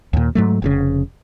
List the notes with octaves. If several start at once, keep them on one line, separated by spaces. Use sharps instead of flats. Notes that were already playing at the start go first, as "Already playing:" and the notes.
D#2 A#2
G#2 F#3 A3
F1 A#2 C#3